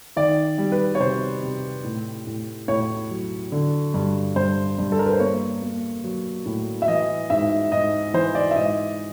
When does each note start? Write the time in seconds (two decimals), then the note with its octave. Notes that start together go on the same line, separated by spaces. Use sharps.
0.16 D#3 D5
0.58 G3
0.72 B4
0.95 C#5
1.00 C3 C5
1.43 C3
1.84 A2
2.27 A2
2.68 A2 C#5
3.10 F#3
3.52 D3
3.94 G2
4.36 G2 C5
4.78 G2
4.92 A4
4.99 A#4
5.06 B4
5.13 C5
5.20 A#3 C#5
5.62 A#3
6.04 F#3
6.46 A2
6.82 E5
6.88 E3 D#5
7.30 G#2 E5
7.72 G#2 D#5
8.14 E3 C5
8.35 D5
8.51 E5
8.56 G#2 D#5